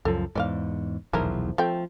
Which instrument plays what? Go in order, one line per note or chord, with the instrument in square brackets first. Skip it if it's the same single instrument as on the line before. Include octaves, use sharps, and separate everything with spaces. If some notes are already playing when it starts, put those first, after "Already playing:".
[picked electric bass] C#2 F#2 F3 [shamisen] A4
[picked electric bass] E2 G#2 [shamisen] D5 D#5 F5
[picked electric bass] D#1 B1 E2 [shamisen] F3 E4 A#4
[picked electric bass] F3 [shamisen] A3 C4 G5